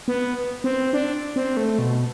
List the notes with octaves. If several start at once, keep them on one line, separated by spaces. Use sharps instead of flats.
B3
C4
D4
C4
A3
B2